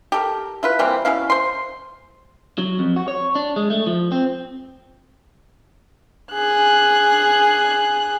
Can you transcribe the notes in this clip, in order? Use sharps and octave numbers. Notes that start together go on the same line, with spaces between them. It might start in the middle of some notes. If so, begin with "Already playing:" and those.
G4 A4 A#4
E4 F4 B4
E3 G3 A#3 C4
B2 C#4 E4 F5
C5 C6
F#3
F2
F#4
C#5
D4
G#3
A3
F3
C4
G#4 F#6